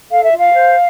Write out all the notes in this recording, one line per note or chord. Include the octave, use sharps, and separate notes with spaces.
A4 F5
E5
F4 F5
C5